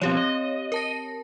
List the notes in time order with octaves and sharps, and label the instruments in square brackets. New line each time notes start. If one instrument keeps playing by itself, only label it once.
[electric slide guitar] B2 F3 [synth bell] C4 G4 C#5
[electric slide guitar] D#5
[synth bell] A#4 A5 A#6